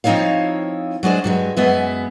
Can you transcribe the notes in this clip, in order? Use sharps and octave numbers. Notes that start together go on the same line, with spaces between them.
F3 C4 D#4 E4 C#5 F5
F#3 G#3 D4 C5
G2 F#3 G#3
F#2 G#3 B3 E5